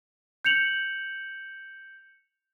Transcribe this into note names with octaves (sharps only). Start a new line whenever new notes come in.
G6 C#7 F7 F#7